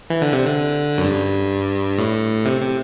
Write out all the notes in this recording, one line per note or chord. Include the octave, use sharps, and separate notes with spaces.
E3
D3
C3
D3
F#2
G2
A2
C3
C3